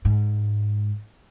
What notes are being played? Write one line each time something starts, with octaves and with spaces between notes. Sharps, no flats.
G#2